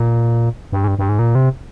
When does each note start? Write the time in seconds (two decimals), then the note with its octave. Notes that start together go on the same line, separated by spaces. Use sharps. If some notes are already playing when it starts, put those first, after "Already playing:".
Already playing: A#2
0.72 G2
0.84 G#2
0.88 G2
0.99 G2
1.09 G#2
1.19 A#2
1.35 C3